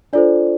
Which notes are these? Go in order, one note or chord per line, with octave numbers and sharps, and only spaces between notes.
D4 F4 A4 C5 D5